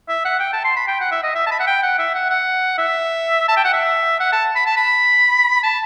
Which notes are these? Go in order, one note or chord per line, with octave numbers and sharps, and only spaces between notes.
E5
F#5
G5
A5
C6
B5
G5
F#5
E5
D#5
E5
A5
B5
F#5
G5
F#5
E5
F#5
F#5
E5
A5
G5
F#5
E5
F#5
A5
B5
A5
B5
A5